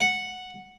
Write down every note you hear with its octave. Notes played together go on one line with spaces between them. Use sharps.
F#5